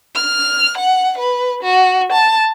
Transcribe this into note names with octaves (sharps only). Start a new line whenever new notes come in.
F6
F#5
B4
F#4
A5